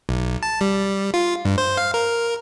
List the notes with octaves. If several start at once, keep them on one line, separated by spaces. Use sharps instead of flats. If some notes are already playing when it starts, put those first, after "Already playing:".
B1
A5
G3
F4
G2
C5
F5
A#4